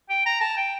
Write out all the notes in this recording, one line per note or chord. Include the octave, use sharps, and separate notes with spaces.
G5
A#5
A5
G5